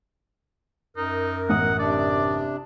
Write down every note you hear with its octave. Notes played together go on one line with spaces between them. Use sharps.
F#2 D#4 A#4
A1 F#5 D#6
C3 D4 D5